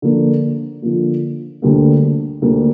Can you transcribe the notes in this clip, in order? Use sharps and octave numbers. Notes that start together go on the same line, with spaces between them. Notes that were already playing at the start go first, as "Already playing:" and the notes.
D3 F3 A#3 F4
D3 F3 A#3 F4
D2 D3 G3 A#3
D2 D3 G3 A#3